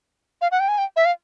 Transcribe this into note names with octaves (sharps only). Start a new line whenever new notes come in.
F5
F#5
G5
G#5
G5
E5
F5